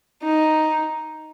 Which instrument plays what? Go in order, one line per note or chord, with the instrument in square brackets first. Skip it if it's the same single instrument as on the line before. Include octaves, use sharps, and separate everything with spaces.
[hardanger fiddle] D#4